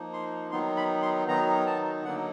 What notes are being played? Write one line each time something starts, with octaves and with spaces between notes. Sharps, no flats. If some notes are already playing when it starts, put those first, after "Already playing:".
Already playing: F3 A#3 D#4
C6
D#3 F#3 B3 D#4 C6
B5
C6
D#3 F#3 B3 D#4 A#5
A5
D3 F#3 A#3 D#4 F#5